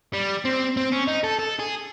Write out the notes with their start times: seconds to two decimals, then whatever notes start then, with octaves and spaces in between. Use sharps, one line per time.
0.14 G3
0.45 C4
0.77 C4
0.92 C#4
1.07 D#4
1.24 A4
1.39 A4
1.59 G#4